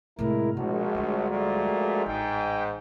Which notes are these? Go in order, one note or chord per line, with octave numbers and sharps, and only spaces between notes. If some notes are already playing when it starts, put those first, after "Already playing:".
A2 C3 G#3 E4 A#4
A#1 B2 G#3 F#4
D2 G3
A#1 A#2 A3
A1 G#2 G5